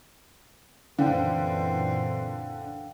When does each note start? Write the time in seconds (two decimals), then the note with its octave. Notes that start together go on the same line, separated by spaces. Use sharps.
0.99 F#2 A#2 D3 E3 C4 F5 G5